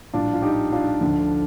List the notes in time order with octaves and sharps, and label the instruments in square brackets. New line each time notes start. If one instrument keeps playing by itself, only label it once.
[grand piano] A#1 A2 G3 D4 F4
F4
D#4 G4
D4 F4
D2 D3 F3